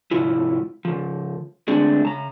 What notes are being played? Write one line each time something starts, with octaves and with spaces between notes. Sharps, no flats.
G#2 C3 F3 E4 F4
C#3 F3
D3 G#3 A3 C4 D4 G#4
C#3 A5 A#5